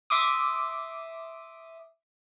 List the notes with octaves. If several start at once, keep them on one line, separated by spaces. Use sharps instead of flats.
E5 C6 D6 D#6